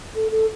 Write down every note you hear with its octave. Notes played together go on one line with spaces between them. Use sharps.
A4
A4